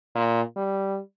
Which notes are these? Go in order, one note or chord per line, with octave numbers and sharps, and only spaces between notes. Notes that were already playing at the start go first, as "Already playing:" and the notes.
A#2
G3